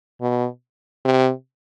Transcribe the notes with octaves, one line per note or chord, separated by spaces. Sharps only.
B2
C3